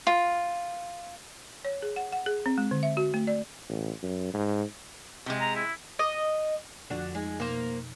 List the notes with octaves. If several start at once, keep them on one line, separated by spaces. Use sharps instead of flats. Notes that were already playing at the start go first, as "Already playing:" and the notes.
F4
C#5
G#4
F#5
F#5
G#4
C4
G#3
D3
E5
F#4
A3
D5
A1
F#2
G#2
C3 G#3
A#5
E4
D#5
F2 D3 F3 D4 F#4
G#3 D#4
B2 A#3 C5